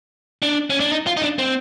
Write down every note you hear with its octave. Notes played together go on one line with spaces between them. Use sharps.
D4
C#4
D4
D#4
F4
D#4
D4
C4